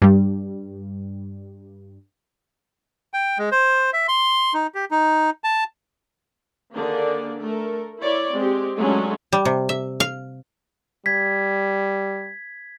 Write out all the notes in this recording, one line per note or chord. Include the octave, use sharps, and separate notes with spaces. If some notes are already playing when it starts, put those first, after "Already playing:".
G2 G3
G5
G#3
C5
E5
C6
D#4
G4
D#4
A5
D3 D#3 A#3 D4 G#4 D5
A3 A4 A#4
E4 C#5 D5
G#3 C4 G4
F#3 G#3 A3 C#4 D4
G3
C3
E5
F5
G3 G#6 B6